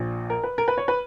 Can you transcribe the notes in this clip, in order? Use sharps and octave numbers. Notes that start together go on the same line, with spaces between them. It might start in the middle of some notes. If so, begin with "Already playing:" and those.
Already playing: A#1 A#2
A#4
B4
A#4
B4
C#5
B4